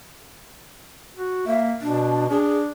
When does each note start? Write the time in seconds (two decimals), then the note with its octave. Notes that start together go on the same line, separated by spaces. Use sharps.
1.17 F#4
1.47 A#3 E5
1.82 B2 D4
2.30 D4 G#4